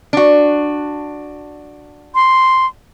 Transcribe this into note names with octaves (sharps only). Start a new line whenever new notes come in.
D4 F#4
C6